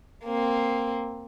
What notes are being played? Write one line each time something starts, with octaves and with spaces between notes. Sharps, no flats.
A#3 C4